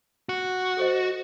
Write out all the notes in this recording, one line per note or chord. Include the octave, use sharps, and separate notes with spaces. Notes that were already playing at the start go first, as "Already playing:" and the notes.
F#4
A4 C5 D#5